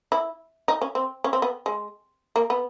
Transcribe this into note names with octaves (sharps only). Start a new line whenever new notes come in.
E4
D#4
C#4
C4
C#4
C4
B3
G#3
A#3
B3